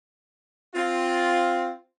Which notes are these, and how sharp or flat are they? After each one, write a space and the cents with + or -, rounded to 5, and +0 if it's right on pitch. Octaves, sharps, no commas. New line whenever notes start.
C4 +0 F4 +5